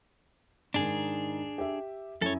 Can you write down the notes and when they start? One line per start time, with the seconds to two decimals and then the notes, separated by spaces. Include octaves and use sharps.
0.74 G#2 D#3 D4 G#4
1.58 G4 E5
2.22 F#2 E4 A4 C#5